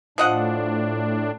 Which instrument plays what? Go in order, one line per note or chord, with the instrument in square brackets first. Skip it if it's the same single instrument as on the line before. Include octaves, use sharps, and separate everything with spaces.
[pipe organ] A2 D4 [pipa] F3 D#5 F#5